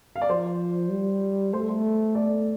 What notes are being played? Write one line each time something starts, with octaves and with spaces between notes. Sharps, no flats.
F5
D5
F3 C5
G3
A3 C5
A4
C5
A4 D5